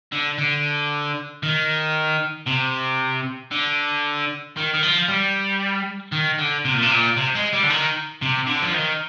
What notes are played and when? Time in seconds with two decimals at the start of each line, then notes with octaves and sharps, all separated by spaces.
0.12 D3
0.38 D3
1.43 D#3
2.47 C3
3.51 D3
4.57 D#3
4.74 D#3
4.83 F3
5.08 G3
6.12 D#3
6.38 D3
6.65 C3
6.74 A#2
6.82 C3
6.91 A#2
7.17 C3
7.35 G#3
7.53 G3
7.63 D3
7.70 D#3
8.22 C3
8.47 D3
8.62 F3
8.74 D#3